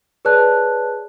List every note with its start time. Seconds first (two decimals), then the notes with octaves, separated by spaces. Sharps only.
0.25 G#4 B4 C#5 D5 A5 F#6